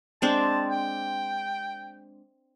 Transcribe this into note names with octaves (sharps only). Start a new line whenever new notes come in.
G#3 C4 D4 A5
G5